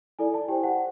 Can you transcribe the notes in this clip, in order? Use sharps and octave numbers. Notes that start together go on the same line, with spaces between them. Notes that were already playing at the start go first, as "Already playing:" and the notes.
E4 A4 D5 G#5
A5
G4 C5 G5
F#5